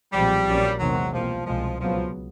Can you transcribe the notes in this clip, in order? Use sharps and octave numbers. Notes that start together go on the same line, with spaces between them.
B1 A#2 F3 G3 G#3 C4
A#1 A#2 F#3 A#3 C#4
E2 C3 D#3 F#3 G#3 C4
C2 B2 F3 G3 A#3
C2 B2 F3 G#3
C#2 B2 F3 F#3 B3